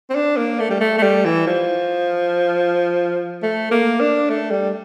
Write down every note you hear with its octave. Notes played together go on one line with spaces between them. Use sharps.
C4
D4
A#3
A3
G3
A3
A3
G3
E3
F3
A3
A#3
D4
A3
G3